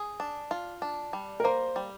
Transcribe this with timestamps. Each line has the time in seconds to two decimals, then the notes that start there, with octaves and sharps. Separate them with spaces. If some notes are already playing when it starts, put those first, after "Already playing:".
Already playing: G#4
0.20 D4
0.51 F4
0.82 D4
1.13 G3
1.40 A#4
1.44 A#3 C5
1.76 G3